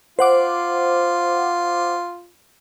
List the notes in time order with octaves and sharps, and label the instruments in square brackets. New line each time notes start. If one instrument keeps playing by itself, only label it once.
[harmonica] F4 [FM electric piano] C5 F#5 D6